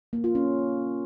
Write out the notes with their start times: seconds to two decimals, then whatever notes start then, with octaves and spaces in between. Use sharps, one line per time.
0.13 A#3
0.24 F4
0.35 C#4